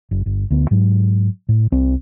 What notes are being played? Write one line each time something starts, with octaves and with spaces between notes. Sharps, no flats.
F#1
G1
D2 B3
G#2 F#3
A2
C2 C4